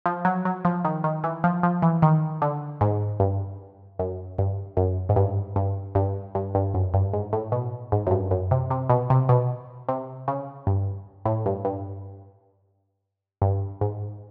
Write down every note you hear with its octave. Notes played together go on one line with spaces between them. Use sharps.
F3
F#3
F#3
F3
D#3
D#3
E3
F3
F3
E3
D#3
D3
G#2
G2
F#2
G2
F#2
G#2
G2
G2
G2
G2
G2
F#2
G2
G#2
A2
B2
G#2
F#2
G2
F#2
C3
C3
B2
C3
B2
C3
C#3
G2
A2
G2
G2
G2
G#2